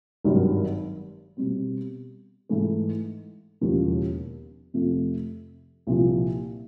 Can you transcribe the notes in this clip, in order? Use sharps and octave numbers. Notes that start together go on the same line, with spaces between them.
G#1 G2 D#3 F#3
B2 G3 C4
G#2 E3 A3
E1 D#2 C#3 F3
F2 C3 F3 A3
C2 A#2 F3